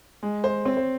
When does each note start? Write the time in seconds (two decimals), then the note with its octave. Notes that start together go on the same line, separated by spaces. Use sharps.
0.23 G#3
0.44 C5
0.65 C4 C#5
0.77 C5